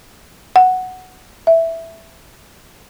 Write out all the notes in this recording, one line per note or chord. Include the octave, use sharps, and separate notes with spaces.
F#5
E5